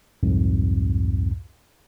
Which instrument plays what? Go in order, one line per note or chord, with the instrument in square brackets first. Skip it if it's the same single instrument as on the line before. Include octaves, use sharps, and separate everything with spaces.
[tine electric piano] C2 F2 G#2